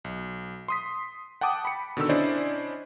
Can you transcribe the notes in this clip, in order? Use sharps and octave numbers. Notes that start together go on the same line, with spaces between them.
B1
C6 D#6 B6
F#5 G5 A5 D6 D#6
B5 C#7
B2 D3 D#3 E6
C#4 D4 E4 C5 D5 D#5